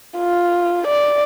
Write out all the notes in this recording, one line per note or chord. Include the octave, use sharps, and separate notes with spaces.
F4
D5